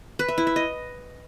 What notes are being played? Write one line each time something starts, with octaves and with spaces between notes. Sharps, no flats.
B4
E5
E4
E5
D#5